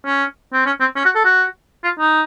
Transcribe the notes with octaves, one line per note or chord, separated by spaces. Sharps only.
C#4
C4
C#4
C4
C#4
F#4
A4
F#4
F4
D#4